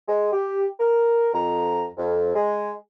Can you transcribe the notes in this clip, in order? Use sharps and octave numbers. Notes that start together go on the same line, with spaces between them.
G#3
G4
A#4
F2 A#5
F2
G#3